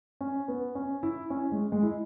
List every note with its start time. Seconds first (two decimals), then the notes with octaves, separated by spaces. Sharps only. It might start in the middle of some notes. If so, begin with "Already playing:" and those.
0.21 C#4
0.48 B3
0.75 C#4
1.03 E4
1.30 C#4
1.51 G#3
1.72 G#3
1.83 E4